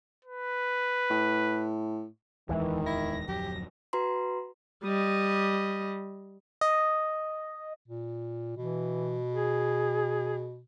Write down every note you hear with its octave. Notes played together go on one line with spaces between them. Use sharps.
B4
A2
D1 E2 D#3 E3 G#3
E4 A#6
D1 F2 F#3 G4
F#4 B4 A#5 C6
G3 D#5
D#5
A#2
B2 E3
G#4